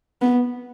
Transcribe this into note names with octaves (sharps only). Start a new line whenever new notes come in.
B3